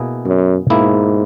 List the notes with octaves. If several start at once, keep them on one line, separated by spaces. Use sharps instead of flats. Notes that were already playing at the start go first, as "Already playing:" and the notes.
Already playing: B2 A#3 E4 G#4
F#2
G#2 B2 A#3 E4 G#4